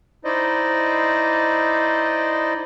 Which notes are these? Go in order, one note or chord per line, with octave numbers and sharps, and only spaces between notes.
D#4 E4 C5 D5 D#5